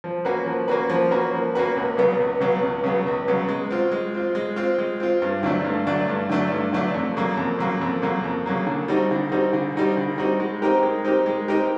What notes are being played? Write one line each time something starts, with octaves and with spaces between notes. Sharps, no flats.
F3
A#3 C#4 F#4 B4
F3
A#3 C#4 F#4 B4
F3
A#3 C#4 F#4 B4
F3
A#3 C#4 F#4 B4
C#2
C#3 F#3 B3
C#2
C#3 F#3 B3
C#2
C#3 F#3 B3
C#2
C#3 F#3 B3
G#3
C4 F4
G#3
C4 F4
G#3
C4 F4
G#3
C4 F4
G2
D3 F#3 A3 D4
G2
D3 F#3 A3 D4
G2
D3 F#3 A3 D4
G2
D3 F#3 A3 D4
F2
C#3 F#3 A#3
F2
C#3 F#3 A#3
F2
C#3 F#3 A#3
F2
C#3 F#3 A#3
D3
G3 C4 D#4 F#4
D3
G3 C4 D#4 F#4
D3
G3 C4 D#4 F#4
D3
G3 C4 D#4 F#4
G#3
C4 D#4 G4 A#4
G#3
C4 D#4 G4 A#4
G#3
C4 D#4 G4 A#4